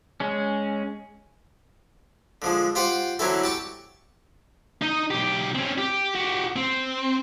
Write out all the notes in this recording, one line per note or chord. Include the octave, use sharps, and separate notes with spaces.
G#3 C#4
D3 F3 G#3
F4 G4 C5 F#5
D3 F#3 C4 C#4 E4 A4
G4 A5 C#6
D#4 D#5
B1 G4
C4 C#4
G4
F#4 G4
C4